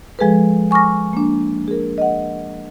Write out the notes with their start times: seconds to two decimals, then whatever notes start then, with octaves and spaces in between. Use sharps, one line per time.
0.19 F3 G#3 G#4 A4 B4
0.71 G#5 C#6 D6 F6 A#6
1.13 A#3 D4
1.68 G#4 A#4
1.98 D#5 F#5